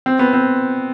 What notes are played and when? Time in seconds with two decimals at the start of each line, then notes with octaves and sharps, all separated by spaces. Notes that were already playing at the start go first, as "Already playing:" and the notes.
0.06 C4
0.19 B3
0.33 C4